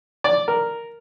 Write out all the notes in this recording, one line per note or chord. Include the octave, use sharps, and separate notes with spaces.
D5
A#4